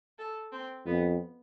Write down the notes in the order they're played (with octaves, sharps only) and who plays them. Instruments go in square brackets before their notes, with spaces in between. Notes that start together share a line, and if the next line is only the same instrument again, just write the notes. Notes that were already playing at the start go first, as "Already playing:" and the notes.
[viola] A4
C4
[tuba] F2 [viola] B3